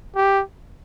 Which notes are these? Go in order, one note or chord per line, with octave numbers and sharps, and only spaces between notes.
G4